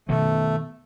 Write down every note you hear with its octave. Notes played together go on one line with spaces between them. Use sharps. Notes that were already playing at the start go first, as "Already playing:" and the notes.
B2 D#3 A3 B3